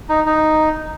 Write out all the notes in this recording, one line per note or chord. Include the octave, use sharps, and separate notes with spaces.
D#4
D#4